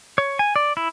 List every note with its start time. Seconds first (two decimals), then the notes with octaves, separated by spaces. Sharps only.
0.18 C#5
0.39 G#5
0.56 D5
0.77 E4